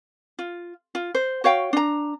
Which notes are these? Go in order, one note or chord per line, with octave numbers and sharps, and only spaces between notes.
F4
F4
C5
F#4 C#5 F5 G5
D4 A#5